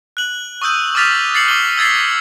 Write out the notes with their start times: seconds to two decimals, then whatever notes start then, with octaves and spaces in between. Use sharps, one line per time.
0.17 F#6 F#7
0.62 C#6 D#6 E6 G6 D#7
0.95 D6 D#6 F6 A6 B6 F7
1.34 A6 C7 C#7 F#7
1.48 D6 G7
1.78 E6 G#6 A6 B6 C7